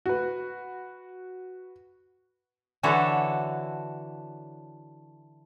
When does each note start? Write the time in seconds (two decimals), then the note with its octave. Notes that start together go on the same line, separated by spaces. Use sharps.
0.06 F#4 B4
2.83 D3 E3 E4 F#4 A4 C#5